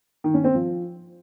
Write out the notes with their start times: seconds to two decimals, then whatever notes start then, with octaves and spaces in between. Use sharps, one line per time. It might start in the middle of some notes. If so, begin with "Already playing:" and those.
0.24 D#3
0.34 C#4
0.44 C4
0.55 F3